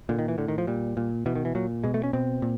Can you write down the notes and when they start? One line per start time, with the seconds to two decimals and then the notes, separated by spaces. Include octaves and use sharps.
0.09 A#2 D3
0.19 D#3
0.28 E3
0.38 A2 D3
0.48 D#3
0.58 F3
0.67 A#2 G3
0.97 A#2
1.26 B2 E3
1.36 D#3
1.45 E3
1.55 A#2 F#3
1.84 B2 G#3
1.94 A3
2.03 C#4
2.13 B2 C4
2.42 A#2